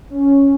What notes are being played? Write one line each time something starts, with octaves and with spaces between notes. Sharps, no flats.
C#4